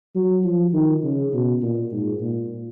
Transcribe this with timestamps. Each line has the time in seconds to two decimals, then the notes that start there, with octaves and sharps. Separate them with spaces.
0.15 F#3
0.44 F3
0.73 D#3
1.03 C#3
1.33 B2
1.62 A#2
1.92 G#2
2.21 A#2